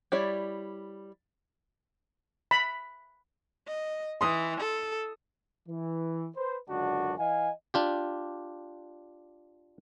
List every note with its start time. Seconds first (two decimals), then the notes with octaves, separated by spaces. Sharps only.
0.12 G3 E4 C#5 D5
2.51 B5
3.67 D#5
4.21 E3 C6 D#6
4.60 A4
5.68 E3
6.36 B4 C5
6.69 C#2 F#2 D3 D4 F#4 F#5
7.18 E3 D#5 F5 G#5
7.74 D4 F4 G4